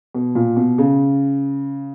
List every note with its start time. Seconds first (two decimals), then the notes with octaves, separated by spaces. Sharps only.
0.15 B2
0.35 A#2
0.57 B2
0.78 C#3